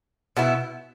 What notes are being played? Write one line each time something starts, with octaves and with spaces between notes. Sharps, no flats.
B2 B3 E4